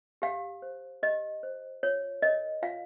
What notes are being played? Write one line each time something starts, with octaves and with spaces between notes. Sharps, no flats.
G4 F5
C5
G4 D#5
C5
F4 C#5
A#4 C#5 D#5
F4 F5